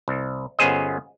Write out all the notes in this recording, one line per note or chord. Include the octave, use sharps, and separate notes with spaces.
C2
G1 B3 C#4 G#4 C5 D#5